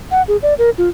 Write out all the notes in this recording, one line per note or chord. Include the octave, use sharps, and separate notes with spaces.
F#5
G#4
D5
A#4
F4